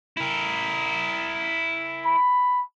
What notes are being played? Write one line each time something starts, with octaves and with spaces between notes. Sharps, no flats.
E4 A#4
B5